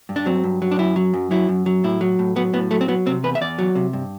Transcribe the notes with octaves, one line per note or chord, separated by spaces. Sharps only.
G2
D4
F#3 C4
G2
F#3
D4
F#2 E4
F#3
F#2
F#3 E4
F#2
F#3
A2 E4
F#3
A2
F#3 B3
A2 B3
F#3 A3
C4
F#3 B3
C3 C4
E2 B4
E5
E2 D5
F#3
C3
G2